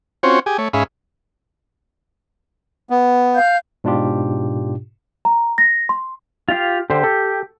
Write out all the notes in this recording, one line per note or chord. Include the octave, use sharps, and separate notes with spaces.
C4 C#4 F4 F#4 C5 C#5
G4 G#4 G#5
A3 C#5
G#2 C#4 G#4 E5 F5 B5
B3
F5 G6
G#2 B2 D4 F4 G4
A#5
A#6
C6
F4 G4 F5
D3 G4 C5
A4